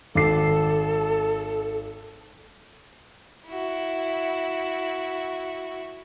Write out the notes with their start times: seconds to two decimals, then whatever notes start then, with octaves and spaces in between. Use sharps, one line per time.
0.15 G#1 A4 D6 C7
3.47 E4 F#4